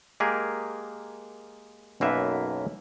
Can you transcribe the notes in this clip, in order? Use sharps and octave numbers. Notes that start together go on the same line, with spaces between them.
G#3 A#3 G4 G#4 A#4
B1 F#2 A#3 B4 E5